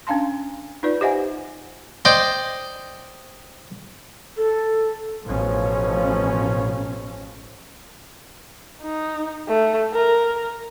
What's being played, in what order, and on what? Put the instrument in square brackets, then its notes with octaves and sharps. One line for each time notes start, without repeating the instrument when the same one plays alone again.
[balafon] C#4 D4 F5 A5 C6
D#4 F4 B4 D5
G4 C5 D#5 E5 F#5 G#5
[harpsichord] C5 D5 D#5 G5
[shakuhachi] A4
[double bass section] A1 B2 F3 C#4
[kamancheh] D#4
A3
A#4